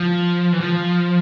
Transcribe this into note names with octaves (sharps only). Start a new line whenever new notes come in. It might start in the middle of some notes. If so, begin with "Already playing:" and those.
Already playing: F3
E3
F3